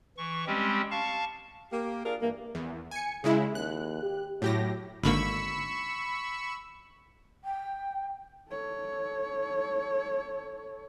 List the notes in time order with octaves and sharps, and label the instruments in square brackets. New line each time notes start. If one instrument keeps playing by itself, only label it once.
[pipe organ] E3 C#6
G3 G#3 C4 C#4 G4
F5 A5 C#6
[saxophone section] A#3 G4
D4 F4 G#4 A#4 D5
G2 E3 A#3
[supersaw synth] E2
G#5 C#7
[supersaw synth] C#3 G#3 E4 [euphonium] G#4
[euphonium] D#2 [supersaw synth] F#6
[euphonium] G4
[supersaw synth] A2 G4 A#6 [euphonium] F#3
[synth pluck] G#1 D3 A#3 [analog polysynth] B5 C#6 E6
[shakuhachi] G5
[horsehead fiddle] A4 C#5